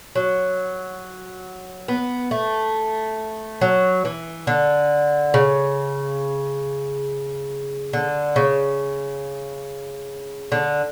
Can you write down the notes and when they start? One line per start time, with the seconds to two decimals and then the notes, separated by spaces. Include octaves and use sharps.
0.15 F#3
1.88 B3
2.31 A3
3.61 F#3
4.05 E3
4.47 D3
5.34 C#3
7.93 D3
8.36 C#3
10.52 D3